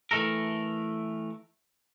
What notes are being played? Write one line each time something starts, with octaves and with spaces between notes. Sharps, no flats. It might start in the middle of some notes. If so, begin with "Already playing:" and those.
E3 A3 A4 A#4